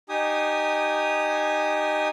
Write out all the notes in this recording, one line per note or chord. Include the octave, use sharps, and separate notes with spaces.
D#4 G4 G#5 D#6